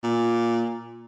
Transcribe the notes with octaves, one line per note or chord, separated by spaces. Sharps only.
A#2